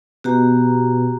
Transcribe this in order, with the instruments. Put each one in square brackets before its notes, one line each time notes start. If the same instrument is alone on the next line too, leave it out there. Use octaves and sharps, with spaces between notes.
[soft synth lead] B2 [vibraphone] F#4 G4 A#5